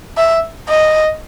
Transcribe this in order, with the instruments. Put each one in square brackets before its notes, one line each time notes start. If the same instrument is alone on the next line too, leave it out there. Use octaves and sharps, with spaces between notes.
[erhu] E5
D#5